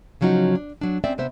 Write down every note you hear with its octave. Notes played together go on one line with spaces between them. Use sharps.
C#3 F3 F#3 C#4 D#4 F#4
D4
F#3 D4
C4 C#4 D5 E5
C3 B3 C5 E5